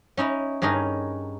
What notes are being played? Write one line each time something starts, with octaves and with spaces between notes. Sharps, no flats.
C#4 D#4 E4
G2 C#4 D#4 G#4 A#4